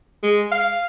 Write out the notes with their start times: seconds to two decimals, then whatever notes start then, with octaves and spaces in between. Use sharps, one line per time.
0.23 G#3
0.51 F5